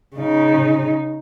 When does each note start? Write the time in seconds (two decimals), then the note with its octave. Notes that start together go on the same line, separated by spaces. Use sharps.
0.16 C#3 D#4